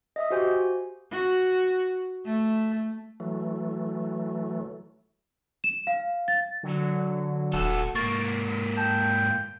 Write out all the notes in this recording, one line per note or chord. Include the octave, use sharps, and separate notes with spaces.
D#5 E5 D#6
F#4 G4 C5 G#5 G6
F#4
A3
E3 F#3 A3
E7
F5
A6
D3 F#3
D#1 F#4 A4
G#2 A#3 C#6 A6
G5 A5